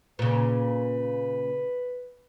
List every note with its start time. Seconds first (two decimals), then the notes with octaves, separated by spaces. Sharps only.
0.19 A#2 C#3 B4